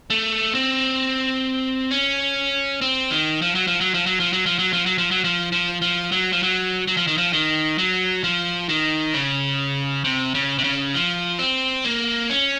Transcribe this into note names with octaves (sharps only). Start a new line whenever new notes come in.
A3
C4
C#4
C4
D#3
F3
F#3
F3
F#3
F3
F#3
F3
F#3
F3
F#3
F3
F#3
F3
F#3
F3
F3
F3
F#3
F3
F#3
F#3
F3
D#3
F3
D#3
F#3
F3
D#3
C#3
C3
C#3
C3
C#3
F3
C4
A#3
C#4